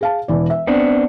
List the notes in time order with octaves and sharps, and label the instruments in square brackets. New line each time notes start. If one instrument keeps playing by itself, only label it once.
[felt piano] G#4 F5 A5
E1 E3 D5
E5
[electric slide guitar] B3 C4 D4